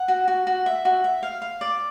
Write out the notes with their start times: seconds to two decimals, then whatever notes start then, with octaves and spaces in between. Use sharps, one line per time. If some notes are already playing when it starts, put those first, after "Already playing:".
Already playing: F#5
0.08 F#4
0.28 F#4
0.47 F#4
0.66 E5
0.85 F#4
1.04 E5
1.23 F5
1.42 F5
1.61 D5